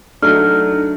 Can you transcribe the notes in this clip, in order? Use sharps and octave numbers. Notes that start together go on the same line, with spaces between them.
F#3 A3 D4 D#4 F6